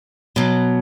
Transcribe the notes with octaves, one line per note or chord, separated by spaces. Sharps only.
B2 F#3